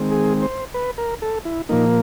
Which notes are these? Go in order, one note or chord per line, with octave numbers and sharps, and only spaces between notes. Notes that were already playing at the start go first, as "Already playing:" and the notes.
Already playing: D#3 G#3 C4
G#4
C5
B4
A#4
A4
E4
A#2 F3 A#3 D#4